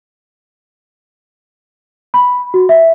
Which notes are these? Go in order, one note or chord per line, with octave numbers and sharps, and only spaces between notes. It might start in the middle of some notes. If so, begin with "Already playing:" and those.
B5
F#4
E5